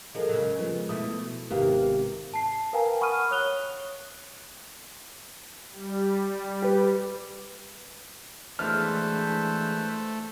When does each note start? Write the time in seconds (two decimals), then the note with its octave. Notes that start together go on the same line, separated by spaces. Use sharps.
0.15 F3 G#3 A4 A#4 D#5
0.29 C#3 F#3
0.59 F3 G#3 B3
0.89 B2 A3 E4 D#6
1.50 G#1 C3 A#3 B3 F5
2.34 A5 C7
2.73 A#4 B4 F5 G5 G#5 A#5
3.01 F#5 B5 C#6 D#6 F6 D#7
3.31 C#5 D#6 F#6 F7 G7
5.71 G3
6.63 G4 B4
8.59 E3 G#3 A3 D4 B4 C5 E5 F6